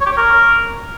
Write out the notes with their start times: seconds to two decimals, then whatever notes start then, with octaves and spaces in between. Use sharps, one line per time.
0.01 C#5
0.06 G4
0.12 C#5
0.17 A#4